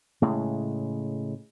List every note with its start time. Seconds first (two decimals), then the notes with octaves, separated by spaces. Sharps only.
0.22 A2 C#3 G#3